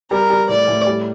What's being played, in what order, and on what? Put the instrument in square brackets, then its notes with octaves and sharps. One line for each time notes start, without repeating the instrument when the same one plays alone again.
[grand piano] G3 [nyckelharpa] A#4
[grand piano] G3
[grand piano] A2 [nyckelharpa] D5
[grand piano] A2
G3